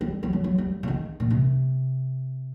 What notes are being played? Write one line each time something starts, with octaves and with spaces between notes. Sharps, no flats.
G3
G3
F#3
F#3
G3
D3
D#3
A#2
C3